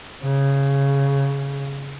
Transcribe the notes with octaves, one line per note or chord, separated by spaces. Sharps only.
C#3